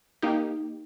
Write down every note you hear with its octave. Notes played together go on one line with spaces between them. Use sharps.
A#3 D#4 G4